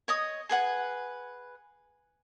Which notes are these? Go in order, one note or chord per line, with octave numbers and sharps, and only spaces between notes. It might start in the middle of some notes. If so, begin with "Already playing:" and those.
C#5 D#5 D#6
G#4 B4 F#5 G#5